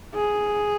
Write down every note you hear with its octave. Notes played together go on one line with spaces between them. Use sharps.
G#4